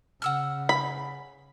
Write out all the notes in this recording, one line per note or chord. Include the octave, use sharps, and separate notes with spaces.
C#3 F#5 E6 F6
B5